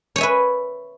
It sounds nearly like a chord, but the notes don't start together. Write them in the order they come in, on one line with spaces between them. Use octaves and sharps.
C#5 G#5 E5 B4